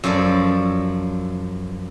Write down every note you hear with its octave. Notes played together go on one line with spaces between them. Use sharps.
F#2 F3 A4 D5